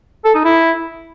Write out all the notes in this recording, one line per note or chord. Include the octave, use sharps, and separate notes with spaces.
A4
D#4
E4